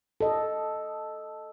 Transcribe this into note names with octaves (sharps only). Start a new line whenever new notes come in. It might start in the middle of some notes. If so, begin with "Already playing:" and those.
A4 D#5